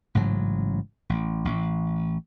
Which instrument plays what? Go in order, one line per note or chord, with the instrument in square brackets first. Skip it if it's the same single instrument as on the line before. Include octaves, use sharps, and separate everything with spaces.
[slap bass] A1 G#2 C#3 F#3
A1
A1